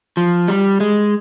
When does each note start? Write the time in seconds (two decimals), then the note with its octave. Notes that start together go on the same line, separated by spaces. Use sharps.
0.17 F3
0.48 G3
0.80 G#3